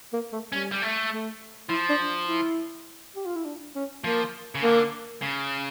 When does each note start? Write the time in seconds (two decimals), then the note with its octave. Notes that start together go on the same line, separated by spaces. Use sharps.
0.13 A#3
0.32 A3
0.52 G3 C#4
0.72 G3
0.82 A3
1.11 A3
1.69 F3 E4
1.89 D4
2.28 E4
3.16 G4
3.25 F4
3.36 E4
3.45 D4
3.75 C#4
4.04 F3 A#3
4.55 C#3
4.63 D3 A#3
5.22 C#3